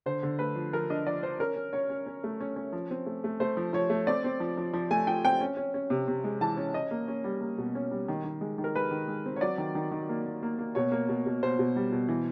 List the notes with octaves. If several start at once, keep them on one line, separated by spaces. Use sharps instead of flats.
D3 C5
D3
A3 B4
F3
F3 A#4
D4 D#5
F3 D5
F3 C5
C#4 A#4
C#4
C#4 C#5
C#4
C#4
A3
C#4
C#4
F3
C4
A3
A3
A3 C5
F3
F3 C#5
A3
C4 D5
C4
F3
F3
F3
A3 G#5
F3 G5
C4 G5
C#4
C#4
C#4
C3
C3
G#3
E3 A5
C#4
C#4 D#5
A#3
C#4
G3
A#3
B2
C#4
G3
D#3
D#3
G#3
D#3
A#4
G#3 B4
D#3
G#3
C4
C#5
F#3 D5
D#3
D#3
D#3
A#3
A#3
A#3
A#3
B2 C#5
A#3
B2
B2
B2 C5
B2
G3
B2
E3